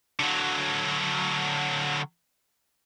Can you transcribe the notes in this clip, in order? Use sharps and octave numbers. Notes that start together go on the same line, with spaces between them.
D3 F#3